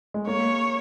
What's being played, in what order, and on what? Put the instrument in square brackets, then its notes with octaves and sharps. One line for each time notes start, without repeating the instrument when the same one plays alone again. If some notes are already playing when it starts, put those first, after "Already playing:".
[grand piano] G#3
[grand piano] A#3 [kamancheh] C#5